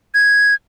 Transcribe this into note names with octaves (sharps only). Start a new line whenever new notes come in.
G#6